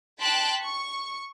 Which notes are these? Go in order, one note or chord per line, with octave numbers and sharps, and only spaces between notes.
G5 A5 C6 F#6 B6 D7
C#6